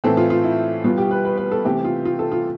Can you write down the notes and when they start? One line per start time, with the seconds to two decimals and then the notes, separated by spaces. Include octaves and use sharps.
0.04 A2 E3 A3 C4 A4
0.17 F4
0.30 F4
0.44 E4
0.84 B2 G3 B3 F4
0.98 G4
1.11 B4
1.25 B4
1.37 B4
1.52 A4
1.64 C3 E3 A3 C4 G4
1.85 F4
2.05 F4
2.19 A4
2.32 F4